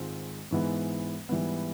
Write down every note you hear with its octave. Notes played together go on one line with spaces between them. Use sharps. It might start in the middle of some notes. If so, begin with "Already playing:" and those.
Already playing: G#2 D#3 G#3 C4 F4
G#2 E3 G#3 B3
G#2 E3 G3 B3